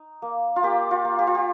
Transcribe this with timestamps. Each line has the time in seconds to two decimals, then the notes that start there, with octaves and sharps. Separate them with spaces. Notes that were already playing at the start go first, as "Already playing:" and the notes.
Already playing: D#4
0.22 A#3
0.56 F4
0.63 A#3 G4
0.91 F4
1.05 A#3
1.19 G4
1.27 F4
1.35 G4